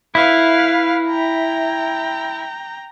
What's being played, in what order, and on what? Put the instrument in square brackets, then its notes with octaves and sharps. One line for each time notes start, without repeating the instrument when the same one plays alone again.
[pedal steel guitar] E4 [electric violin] B4 F5
[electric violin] G5 A#5